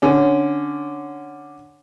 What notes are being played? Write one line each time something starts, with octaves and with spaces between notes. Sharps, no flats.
D3 C#4